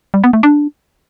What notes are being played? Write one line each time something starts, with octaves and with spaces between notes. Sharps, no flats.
G3
B3
A3
D4